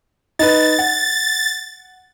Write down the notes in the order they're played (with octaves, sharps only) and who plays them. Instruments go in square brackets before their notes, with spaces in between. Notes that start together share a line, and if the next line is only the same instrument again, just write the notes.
[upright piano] D#4 B4 [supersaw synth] A6
[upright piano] F#5